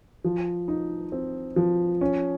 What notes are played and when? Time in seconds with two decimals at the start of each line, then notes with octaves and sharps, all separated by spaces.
0.24 F3
0.68 D#4
1.12 C4
1.56 F3
2.01 C#4